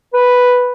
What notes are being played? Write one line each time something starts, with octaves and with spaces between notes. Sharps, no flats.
B4